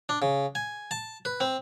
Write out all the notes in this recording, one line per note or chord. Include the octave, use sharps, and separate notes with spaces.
D4
C#3
G#5
A5
B4
C4